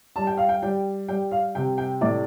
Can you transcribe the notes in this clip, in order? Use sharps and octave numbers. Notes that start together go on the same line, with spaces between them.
G3 A5
G5
F5
G5
G3 G5
G3 G5
F5
C3 G5
G5
A2 D5